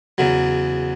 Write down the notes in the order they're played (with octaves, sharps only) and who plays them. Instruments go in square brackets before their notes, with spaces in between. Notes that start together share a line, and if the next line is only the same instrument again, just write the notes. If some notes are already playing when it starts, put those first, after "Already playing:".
[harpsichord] E2 C#3 F#3